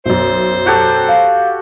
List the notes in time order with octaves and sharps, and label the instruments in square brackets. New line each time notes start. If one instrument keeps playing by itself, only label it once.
[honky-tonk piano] B1 F#2 [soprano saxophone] C5
[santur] F#4 G4 A4
[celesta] F5